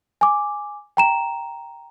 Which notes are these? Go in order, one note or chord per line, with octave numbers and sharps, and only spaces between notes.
G#5 D6
G5 A#5 E7